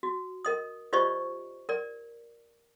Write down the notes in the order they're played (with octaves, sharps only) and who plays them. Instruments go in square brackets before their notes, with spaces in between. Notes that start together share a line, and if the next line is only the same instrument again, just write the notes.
[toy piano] F#4
A#4 D#5 D#6
F4 G4 C5 D5 D#5 C#6
A#4 D5